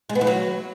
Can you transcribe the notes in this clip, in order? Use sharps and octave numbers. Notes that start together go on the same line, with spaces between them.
G#3
B3
E3
F#3